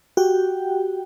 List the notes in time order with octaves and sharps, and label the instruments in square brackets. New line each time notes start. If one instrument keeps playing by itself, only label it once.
[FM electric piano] F#4 G4 G5